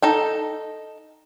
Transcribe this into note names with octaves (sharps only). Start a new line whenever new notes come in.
D#4 A4 G5